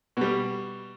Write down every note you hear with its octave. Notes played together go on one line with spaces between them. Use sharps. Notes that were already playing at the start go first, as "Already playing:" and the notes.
B2 G3